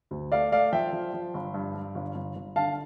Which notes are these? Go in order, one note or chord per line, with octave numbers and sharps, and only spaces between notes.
D2
A3 D5 F5
A3 D5 F5
F3 E5 G5
F3
F3
G1
G2
G2
G1
G1
G1
D3 F5 A5